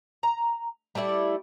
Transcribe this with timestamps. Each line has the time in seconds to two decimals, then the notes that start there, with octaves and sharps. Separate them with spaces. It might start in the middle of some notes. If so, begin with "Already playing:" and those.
0.23 A#5
0.95 G3 A3 E4 D5